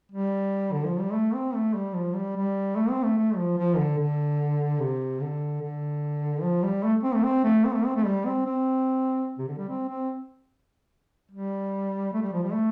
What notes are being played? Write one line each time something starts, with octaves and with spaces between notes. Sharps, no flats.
G3
D3
F3
G3
A3
C4
A3
G3
F3
G3
G3
A3
C4
A3
A3
F3
F3
D3
D3
C3
D3
D3
F3
G3
A3
C4
A3
C4
A3
C4
A3
C4
A3
G3
C4
C4
C3
D3
G3
C4
C4
G3
A3
G3
F3
G3
A3